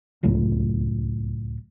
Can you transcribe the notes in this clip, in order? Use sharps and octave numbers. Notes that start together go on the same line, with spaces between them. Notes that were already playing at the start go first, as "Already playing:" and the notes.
D1 C#2 F#2 A2